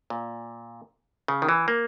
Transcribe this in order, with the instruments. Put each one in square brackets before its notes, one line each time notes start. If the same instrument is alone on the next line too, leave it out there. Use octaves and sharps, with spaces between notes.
[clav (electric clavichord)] A#2
C#3
D#3
E3
A#3